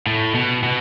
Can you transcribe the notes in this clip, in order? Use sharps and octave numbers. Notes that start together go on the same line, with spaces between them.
A2
B2
B2